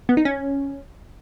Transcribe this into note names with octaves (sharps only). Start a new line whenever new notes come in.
B3
D#4
C#4